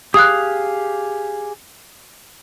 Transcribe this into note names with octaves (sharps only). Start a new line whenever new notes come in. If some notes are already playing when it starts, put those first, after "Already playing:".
G4 G#4 F5 D#6 F#6